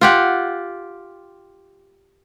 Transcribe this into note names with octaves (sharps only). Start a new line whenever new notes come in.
F4 G4 F#5